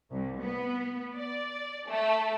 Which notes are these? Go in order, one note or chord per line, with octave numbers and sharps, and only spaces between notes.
C2
B3
D5
A3